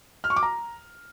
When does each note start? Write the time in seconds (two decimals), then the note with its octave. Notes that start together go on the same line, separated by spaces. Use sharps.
0.24 F6
0.30 C#6
0.36 D6
0.43 A#5